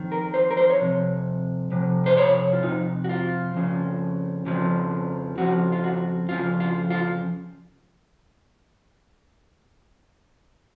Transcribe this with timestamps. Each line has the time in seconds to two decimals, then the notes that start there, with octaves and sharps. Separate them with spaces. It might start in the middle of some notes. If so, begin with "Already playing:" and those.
Already playing: F2 D#3
0.12 A#4
0.34 C5
0.51 A#4
0.57 C5
0.70 C#5
0.81 F2 C3
1.72 F2 C3
2.06 C5
2.17 C#5
2.53 F4
2.63 F2 C3 D#4
3.04 F#4
3.09 F4
3.54 F2 C#3 F3
4.46 F2 C#3 F3
5.38 F2 C#3 F3 F#4
5.72 F4
5.84 F#4
6.29 F2 C#3 F3 F4
6.60 F4
6.90 F4